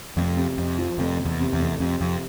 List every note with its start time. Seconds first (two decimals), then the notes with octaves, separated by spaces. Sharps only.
0.17 F1 F2
0.37 C3
0.58 F2 C3
0.79 F3
0.98 F1 F2
1.19 F1
1.25 E2
1.40 C3
1.53 E2
1.59 F1
1.80 F2 C3
2.01 F2 C3